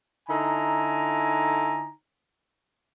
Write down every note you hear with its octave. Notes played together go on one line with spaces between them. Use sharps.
D3 D#4 E4 G#5 A#5